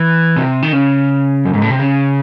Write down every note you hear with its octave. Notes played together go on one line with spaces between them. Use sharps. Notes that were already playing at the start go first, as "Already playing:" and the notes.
Already playing: E3
C3
D#3
C#3
F#2
G#2
A2
C3
C#3